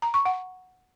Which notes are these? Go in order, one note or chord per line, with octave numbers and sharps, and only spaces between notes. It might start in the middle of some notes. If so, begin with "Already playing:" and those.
A#5
C#6
F#5